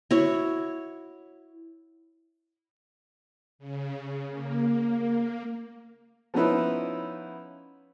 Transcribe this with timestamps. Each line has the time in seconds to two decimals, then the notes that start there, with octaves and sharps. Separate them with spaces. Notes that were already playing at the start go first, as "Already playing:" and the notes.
0.11 E4 F#4 C#5
3.59 C#3
4.30 A#3
6.34 F3 B3 C#4 D#4 E4 B4